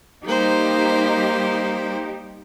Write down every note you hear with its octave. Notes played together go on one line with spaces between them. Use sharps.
G3 A#3 D#4 G4 C5